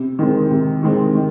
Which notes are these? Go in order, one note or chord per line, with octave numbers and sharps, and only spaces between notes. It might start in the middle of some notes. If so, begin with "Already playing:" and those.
Already playing: C3
D#3 G#3 C4
C3
D#3 G#3 C4
D#3